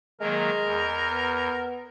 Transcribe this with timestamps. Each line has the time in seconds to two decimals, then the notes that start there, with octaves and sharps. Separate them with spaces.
0.21 D#3 F#3 G#3 A#3 A#4
0.63 E2
1.12 B3